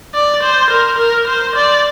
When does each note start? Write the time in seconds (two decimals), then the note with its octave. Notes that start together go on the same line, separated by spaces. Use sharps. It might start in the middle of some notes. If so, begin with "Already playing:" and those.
0.15 D5
0.43 C5
0.71 A#4
0.99 A#4
1.28 C5
1.55 D5